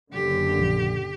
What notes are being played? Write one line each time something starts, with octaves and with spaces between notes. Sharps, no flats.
F#1 D3 G4
A#1 F3